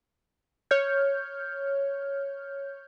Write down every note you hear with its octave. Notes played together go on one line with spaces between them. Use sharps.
C#5 F6 G6